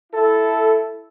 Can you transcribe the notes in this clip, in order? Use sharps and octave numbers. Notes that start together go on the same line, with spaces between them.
E4 A4